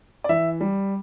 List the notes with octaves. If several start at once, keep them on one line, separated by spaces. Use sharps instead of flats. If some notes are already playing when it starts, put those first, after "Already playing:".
D5
E3 E5
G3